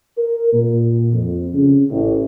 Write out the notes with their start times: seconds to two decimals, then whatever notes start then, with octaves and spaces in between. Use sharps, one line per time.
0.18 A#4
0.52 A#2
1.13 F2
1.54 C#3
1.90 A1